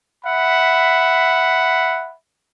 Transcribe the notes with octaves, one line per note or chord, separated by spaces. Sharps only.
E5 F#5 B5